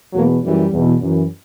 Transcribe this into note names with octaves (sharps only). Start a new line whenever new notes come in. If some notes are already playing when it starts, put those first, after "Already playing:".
E2 B2 F#3 A#3
F#2 E3 G3
E2 B2
F#2 E3